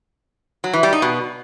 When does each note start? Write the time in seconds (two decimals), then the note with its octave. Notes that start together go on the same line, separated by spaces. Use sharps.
0.64 F#3
0.73 E3
0.83 G3
0.93 D#4
1.02 B2